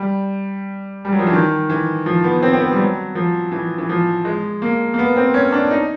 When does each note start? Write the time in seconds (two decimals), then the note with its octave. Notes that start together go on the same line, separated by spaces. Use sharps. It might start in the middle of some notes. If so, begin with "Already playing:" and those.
Already playing: G3
1.05 G3
1.12 F#3
1.19 F3
1.27 E3
1.33 D#3
1.70 E3
2.06 F3
2.24 B3
2.42 C4
2.53 C4
2.61 B3
2.72 G3
2.79 F#3
3.15 F3
3.52 E3
3.78 E3
3.89 F3
4.25 G#3
4.62 A#3
4.94 A#3
4.99 B3
5.17 C4
5.34 C#4
5.52 D4
5.71 D#4